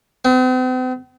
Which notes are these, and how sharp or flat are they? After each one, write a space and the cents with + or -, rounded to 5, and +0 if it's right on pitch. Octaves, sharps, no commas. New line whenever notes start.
C4 -45